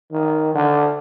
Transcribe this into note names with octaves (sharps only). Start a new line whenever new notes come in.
D#3
D3